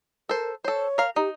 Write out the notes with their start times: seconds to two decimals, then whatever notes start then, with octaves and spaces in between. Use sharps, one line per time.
0.29 A4 A#4 C5
0.64 A4 C5 C#5
0.98 A#4 F5
1.16 D#4 G4